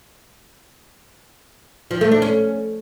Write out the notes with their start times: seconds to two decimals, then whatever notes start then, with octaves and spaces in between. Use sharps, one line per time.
1.91 F3
2.01 A3
2.11 D4
2.22 C#4